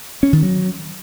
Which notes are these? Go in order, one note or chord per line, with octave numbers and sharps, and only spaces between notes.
C#4
D#3
F#3